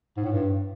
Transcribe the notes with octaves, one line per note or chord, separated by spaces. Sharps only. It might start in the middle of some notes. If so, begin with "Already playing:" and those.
G#2
A2
G2